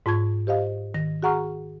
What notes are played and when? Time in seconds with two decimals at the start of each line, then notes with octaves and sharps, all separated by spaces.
0.06 G#2 F4 A5 C#6 G#6
0.47 G4 C5 D#5 F5
0.94 D#3 A#6
1.23 F#4 G#4 F#5 A#5 C#6 F6